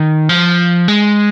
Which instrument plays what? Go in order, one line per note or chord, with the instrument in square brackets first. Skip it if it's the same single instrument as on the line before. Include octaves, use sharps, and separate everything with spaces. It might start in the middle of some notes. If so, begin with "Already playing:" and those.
Already playing: [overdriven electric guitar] D#3
F3
G#3